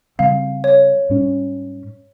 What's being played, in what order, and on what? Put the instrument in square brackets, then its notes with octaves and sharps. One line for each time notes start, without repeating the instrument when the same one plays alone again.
[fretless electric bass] C#3 G3 C4 [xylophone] F5
[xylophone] C#5
[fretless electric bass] G#2 G3 C#4